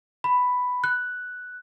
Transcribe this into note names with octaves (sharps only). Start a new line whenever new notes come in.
B5
F#6